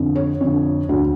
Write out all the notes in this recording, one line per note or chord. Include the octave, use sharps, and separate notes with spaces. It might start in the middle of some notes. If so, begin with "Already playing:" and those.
Already playing: F2 D3
C#5
F2 D3
D2 D3